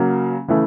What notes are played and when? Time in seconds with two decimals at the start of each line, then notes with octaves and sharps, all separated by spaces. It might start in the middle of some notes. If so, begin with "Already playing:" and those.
Already playing: C#3 F#3 A#3
0.48 C#3 E3 A3